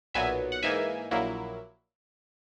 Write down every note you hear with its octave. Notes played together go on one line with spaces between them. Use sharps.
B1 A#2 F#3 B3 E5 G#5
F#5
G#2 E3 A#3 D#4 E5 G#5
A#1 A#2 F#3 A#3 E4